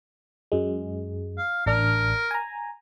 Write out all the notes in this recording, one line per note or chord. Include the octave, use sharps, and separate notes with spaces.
F#2 G#3
F5
A1 D4 A#4 F6
G#5 A#5